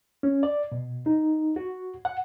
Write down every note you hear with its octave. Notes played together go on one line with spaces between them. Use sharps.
C#4
D5
B2
D#4
F#4
F#5